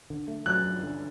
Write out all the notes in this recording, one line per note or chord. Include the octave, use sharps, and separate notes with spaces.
D3
A3
F#3 F#6
G2
D3